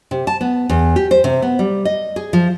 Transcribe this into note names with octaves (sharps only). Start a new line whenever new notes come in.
C3
A5
B3
E2
G4
C5
C3
B3
G3
D#5
G#4
F3